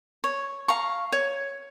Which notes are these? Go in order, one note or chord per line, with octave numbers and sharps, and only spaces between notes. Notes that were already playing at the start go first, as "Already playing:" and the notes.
C#5
F5 A#5 C#6
C#5